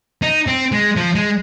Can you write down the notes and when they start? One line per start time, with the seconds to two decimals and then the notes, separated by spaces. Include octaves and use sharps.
0.22 D#4
0.47 C4
0.72 G#3
0.96 F3
1.15 G#3